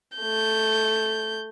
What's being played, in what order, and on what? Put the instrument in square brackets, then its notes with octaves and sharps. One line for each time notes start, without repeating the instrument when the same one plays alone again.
[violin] A3 G6